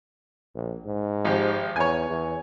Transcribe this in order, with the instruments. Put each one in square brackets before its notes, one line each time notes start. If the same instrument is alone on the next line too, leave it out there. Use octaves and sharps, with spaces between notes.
[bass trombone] A#1
G#2
[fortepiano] G#1 F3 G4
[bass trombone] E2 [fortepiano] C#5 G#5
[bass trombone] E2